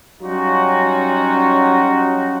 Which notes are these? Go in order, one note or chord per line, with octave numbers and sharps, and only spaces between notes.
F#3 G3 C#4 D#4 F4 F#4